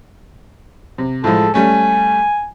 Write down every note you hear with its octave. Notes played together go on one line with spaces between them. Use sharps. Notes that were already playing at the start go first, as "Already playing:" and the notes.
C3
A2 F3 G#3 A4
G3 A3 C#4 G#5